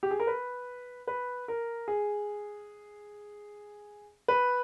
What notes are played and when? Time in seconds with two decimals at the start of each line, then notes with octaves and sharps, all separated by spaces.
0.03 G4
0.11 G#4
0.20 A#4
0.27 B4
1.07 B4
1.48 A#4
1.88 G#4
4.28 B4